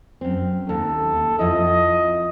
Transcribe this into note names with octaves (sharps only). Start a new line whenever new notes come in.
F#2 C4
D#2 A4
F2 E4 D#5